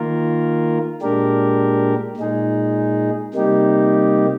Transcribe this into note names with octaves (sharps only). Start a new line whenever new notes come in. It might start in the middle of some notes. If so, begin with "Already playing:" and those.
Already playing: D#3 A#3 F4 A#4
A#2 G#3 D4 G4 A#4
A#2 G#3 D#4 G#4
C3 G3 A#3 D#4 G4